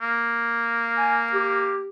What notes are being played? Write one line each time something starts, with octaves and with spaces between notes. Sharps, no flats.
A#3
G#5
G4